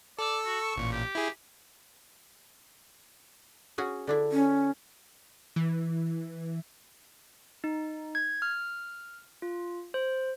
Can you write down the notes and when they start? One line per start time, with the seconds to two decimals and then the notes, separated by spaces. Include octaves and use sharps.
0.19 A4 D5 E6
0.45 F#4
0.61 C#6
0.76 A1 A#2
0.92 G4
1.15 E4 G#4
3.78 C#4 F#4 G#4
4.07 D3 D4 E4
4.32 C#4
5.56 E3
7.64 D#4
8.15 G#6
8.42 F6
9.42 F4
9.94 C5